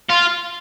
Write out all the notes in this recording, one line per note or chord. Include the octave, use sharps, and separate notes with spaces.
F4